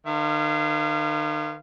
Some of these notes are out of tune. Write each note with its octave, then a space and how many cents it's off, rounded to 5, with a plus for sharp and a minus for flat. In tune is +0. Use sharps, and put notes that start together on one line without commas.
D#3 -45 B4 +0 F5 -30